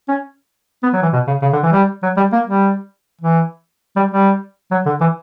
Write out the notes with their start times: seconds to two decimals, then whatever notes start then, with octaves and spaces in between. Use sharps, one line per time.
0.08 C#4
0.83 B3
0.93 F#3
1.02 E3
1.13 B2
1.27 C#3
1.42 C#3
1.53 D3
1.63 E3
1.72 G3
2.03 F#3
2.17 G3
2.32 A#3
2.47 G3
3.21 E3
3.96 G3
4.11 G3
4.71 F#3
4.86 D3
5.01 E3